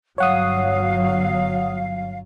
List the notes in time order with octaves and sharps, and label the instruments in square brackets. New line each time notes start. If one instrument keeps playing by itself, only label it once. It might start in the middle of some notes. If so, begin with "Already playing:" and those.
[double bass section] G1 F#3 [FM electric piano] C#5 F#5 D#6 [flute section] F5